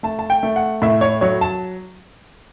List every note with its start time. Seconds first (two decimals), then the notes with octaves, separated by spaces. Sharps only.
0.03 A3 A5
0.19 A5
0.30 G5
0.43 A3
0.56 F#5
0.82 A2 E5
1.01 C#5
1.21 F#3 C#5
1.41 A5